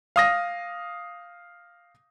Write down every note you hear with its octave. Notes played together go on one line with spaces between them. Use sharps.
F5 D#6 A#6